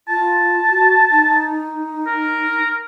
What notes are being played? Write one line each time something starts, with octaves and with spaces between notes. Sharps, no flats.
F4 A5
F#4
D#4
A#4